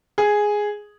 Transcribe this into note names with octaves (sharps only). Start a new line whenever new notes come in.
G#4